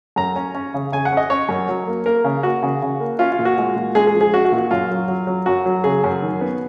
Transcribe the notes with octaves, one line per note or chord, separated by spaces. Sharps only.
F#2 A#5
C#4
C#4
C#3
C#3 G#5
F#5
C#4
D#5
C#4 C#5
F#2
F#3
A#3
A#3 A#4
C#3
A#3 F#4
C#3
C#3
A#3
C#4 F4
F4
A#2
F#4
G#3
A#2
G#3 G#4
G#4
F3
G#4
C#4 F#4
F#4
A#2
F#4
F#2 F4
F#3
F#3
F#3
F#2 F#4
F#3
C#3 G#4
F#2
D#3
B3